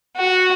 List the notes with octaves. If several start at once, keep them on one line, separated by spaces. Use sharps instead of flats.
F#4